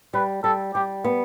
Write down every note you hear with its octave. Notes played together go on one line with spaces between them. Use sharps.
G3 B4
G3 A4
G3 G4
B3